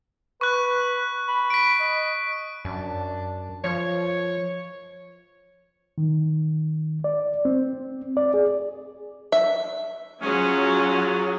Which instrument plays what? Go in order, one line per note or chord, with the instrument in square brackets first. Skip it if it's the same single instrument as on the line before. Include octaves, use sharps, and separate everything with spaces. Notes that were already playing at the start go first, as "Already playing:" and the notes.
[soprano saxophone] B4 [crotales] C#6 F#6
[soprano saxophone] B5
[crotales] B6 D7
[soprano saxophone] D#5
[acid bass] F#2 [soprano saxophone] D4
[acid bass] F3 [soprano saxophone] C#5
[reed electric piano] D#3
D5
C4
D5
G#4
[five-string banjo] E5
[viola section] F#3 [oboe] C#4 [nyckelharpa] F4 G#4